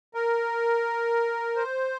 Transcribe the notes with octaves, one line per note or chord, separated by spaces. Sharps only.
A#4
C5